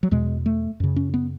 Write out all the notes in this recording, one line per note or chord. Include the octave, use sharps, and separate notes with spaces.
F#3
E2 B2 G#3
A3
F#2 C#3
C#4
B3